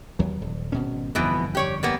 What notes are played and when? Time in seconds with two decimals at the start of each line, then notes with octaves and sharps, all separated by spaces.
0.19 D#2 F#3
0.41 D#1
0.72 G#1 B2 C#4
1.15 G1 F2 G#2 B2 E3 B3
1.55 G4 C#5 D5
1.83 G3 A#3 B3